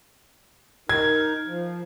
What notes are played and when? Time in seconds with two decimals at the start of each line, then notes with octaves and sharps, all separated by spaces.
0.89 D#4 A#4 G#6
1.45 F3